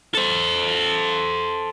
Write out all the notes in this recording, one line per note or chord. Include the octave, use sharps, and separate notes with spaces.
A4 C5